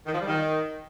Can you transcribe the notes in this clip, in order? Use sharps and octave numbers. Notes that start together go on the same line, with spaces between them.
D#3
F3
G3
D#3